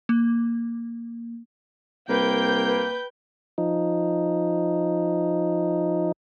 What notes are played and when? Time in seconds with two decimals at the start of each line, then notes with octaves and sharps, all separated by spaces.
0.09 A#3
2.09 C2 A#3 B4 G5 G6
2.67 B4
3.58 F3 D#4